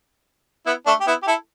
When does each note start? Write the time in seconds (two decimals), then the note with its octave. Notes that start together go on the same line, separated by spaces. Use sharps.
0.66 B3 E4
0.86 A3 D4
1.01 G4
1.07 B3 E4
1.23 G4
1.27 E4 A4